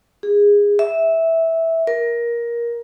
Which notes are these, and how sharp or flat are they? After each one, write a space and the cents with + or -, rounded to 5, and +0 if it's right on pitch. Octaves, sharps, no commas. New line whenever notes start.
G#4 -20
E5 -10
A#4 +15